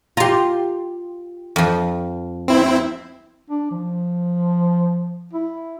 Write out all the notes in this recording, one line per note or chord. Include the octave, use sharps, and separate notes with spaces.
F4 G4 A#5 C6
F2 F3
C4 E4
D4
F3
E4